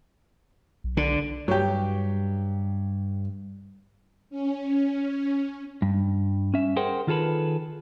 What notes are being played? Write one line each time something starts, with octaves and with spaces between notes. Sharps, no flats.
B1
D3
G2 F#3 G4
C#4
G2
C#4 E5
G#4 A#4 C5 F#5 G5
D#3 F4 G#4 A4 B4